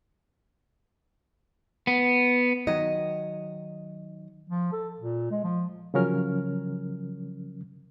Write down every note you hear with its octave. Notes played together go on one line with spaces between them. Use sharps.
B3
D#3 F#3 D#5
F3
A4
A#2
G#3
F3
C#3 F3 F#3 C#4 A#4 F6